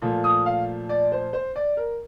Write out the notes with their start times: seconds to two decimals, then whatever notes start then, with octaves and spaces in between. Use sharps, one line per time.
0.02 A#2 F3 A3
0.24 D#6
0.46 F5
0.89 D5
1.12 C5
1.33 C5
1.56 D5
1.77 A#4